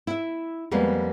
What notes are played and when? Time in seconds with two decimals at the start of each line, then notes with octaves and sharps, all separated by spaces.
0.07 E4 E5
0.71 F2 G3 G#3 A#3 B3